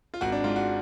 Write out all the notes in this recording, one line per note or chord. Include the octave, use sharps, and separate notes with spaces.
F4
G#1 F#4
D4
G#2 F4
F#4